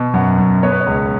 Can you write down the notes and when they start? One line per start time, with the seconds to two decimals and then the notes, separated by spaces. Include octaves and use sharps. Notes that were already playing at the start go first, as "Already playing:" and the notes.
Already playing: B2
0.14 F#2 F#5
0.38 F#2
0.63 B3 C#5
0.72 B4
0.81 C#5
0.87 C#2